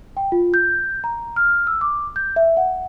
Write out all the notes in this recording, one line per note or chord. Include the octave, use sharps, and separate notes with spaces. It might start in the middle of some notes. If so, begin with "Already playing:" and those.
G5
F4
G6
A#5
F6
E6
D6
G6
E5
F#5